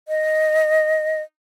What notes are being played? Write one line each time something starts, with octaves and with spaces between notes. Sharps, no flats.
D#5